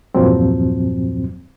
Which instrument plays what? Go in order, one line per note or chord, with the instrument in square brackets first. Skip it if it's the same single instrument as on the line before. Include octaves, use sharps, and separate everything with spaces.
[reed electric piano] E2 G2 A#2 F3 F#3 C4